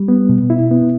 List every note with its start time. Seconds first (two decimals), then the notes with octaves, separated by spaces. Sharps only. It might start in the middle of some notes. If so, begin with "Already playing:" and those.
Already playing: G3
0.08 B3
0.29 B2
0.50 E4
0.71 B3